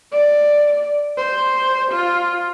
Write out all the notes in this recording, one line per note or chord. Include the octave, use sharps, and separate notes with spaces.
D5
C5
F4